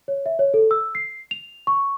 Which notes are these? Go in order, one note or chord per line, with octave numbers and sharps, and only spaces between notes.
C#5
E5
C#5
A4
E6
C7
F7
C#6